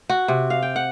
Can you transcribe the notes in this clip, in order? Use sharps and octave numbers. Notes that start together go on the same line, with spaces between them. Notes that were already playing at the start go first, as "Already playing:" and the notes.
F#4
C3
F5
G5
F#5